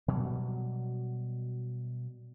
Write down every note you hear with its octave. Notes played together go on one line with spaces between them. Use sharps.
B2 F#3 G3